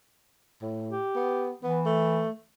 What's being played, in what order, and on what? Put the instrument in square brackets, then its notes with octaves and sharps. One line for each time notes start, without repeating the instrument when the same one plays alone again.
[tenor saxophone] A2
[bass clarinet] G4
[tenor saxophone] B3
[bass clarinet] E3 [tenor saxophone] B3
[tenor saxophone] A3